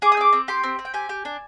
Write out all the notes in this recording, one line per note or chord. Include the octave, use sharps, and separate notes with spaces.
G#4 D6
D#6
C4 D6
C4
G4 C6
C4
C4
G5
G4 G#5
G4
D4